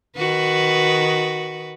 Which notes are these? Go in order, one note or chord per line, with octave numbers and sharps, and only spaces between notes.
D#3 F#4 B4